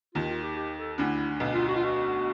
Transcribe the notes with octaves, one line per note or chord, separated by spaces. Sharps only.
D#2 D#3 F4
F4
G4
G4
A4
D2 D3 E4
B1 B2
F4
F#4
F4
F#4